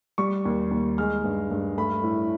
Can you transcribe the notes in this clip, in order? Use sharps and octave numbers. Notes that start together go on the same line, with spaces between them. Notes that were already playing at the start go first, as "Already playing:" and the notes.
G3 C#6
D#2
D#2
G#3 F6
G2
G2
A3 B5
A2